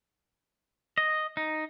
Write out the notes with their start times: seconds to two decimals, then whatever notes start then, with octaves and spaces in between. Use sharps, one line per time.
0.98 D#5
1.37 D#4